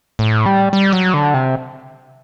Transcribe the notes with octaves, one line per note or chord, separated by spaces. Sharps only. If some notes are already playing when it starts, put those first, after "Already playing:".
A2
G3
G3
F#3
D3
C3